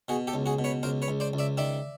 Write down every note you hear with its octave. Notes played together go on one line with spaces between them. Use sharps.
B2 F#4 G#4
G4 A4
C#2
F#4 G#4
B2
B4 C#5
C#2 A#4 C5
B4 C#5
C#2
C5 D5
C#2
D5 E5
D#3 D5 E5